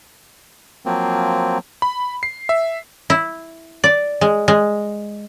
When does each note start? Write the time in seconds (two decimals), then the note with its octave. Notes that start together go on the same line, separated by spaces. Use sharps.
0.86 F3 F#3 A#3 C4
1.82 B5
2.23 C7
2.49 E5
3.10 E4
3.84 D5
4.21 G#3
4.48 G#3